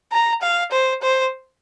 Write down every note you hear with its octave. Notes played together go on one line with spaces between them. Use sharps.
A#5
F5
C5
C5